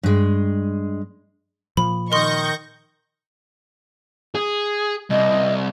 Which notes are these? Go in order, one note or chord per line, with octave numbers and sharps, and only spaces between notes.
G2 G#3
A#2 F3 B5
D#3 A#4 D#5 C6 C#6 G6 A#6
G#4
C2 D#5